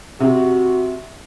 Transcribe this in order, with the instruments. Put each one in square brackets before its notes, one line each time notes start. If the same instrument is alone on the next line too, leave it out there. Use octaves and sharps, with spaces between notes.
[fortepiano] C3 [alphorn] F#4